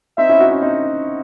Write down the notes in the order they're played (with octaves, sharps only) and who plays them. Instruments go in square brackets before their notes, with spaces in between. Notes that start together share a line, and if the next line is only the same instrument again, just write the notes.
[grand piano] C4 D#4 [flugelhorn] E5
[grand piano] C#4 E4
D#4 F#4
C#4 E4
C4 D#4